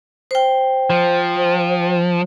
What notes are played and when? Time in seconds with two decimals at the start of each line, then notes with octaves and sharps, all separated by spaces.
0.31 C5 G5
0.90 F3